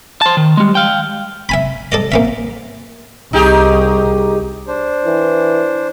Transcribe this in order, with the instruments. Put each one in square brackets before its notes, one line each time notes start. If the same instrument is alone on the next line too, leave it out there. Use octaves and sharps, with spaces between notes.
[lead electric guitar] C5 A5
D#3
G3 G#3
F5 G5
[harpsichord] E5 G#5 B5
A4 D5 D#5
A#3 C#4 E5
[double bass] C2 [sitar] D#4 G4 G#4
[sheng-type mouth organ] D4 C5
[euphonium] E3